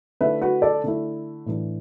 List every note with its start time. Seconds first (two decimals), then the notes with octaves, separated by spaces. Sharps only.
0.21 D3 A3 E4 B4 E5
0.41 F#4 B4
0.62 A4 D5
0.84 D3 A3 E4
1.46 A2 E3 D4